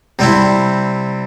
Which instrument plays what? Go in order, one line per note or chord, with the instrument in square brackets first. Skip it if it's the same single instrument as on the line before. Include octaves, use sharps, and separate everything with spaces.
[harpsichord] C3 G3 C4 E4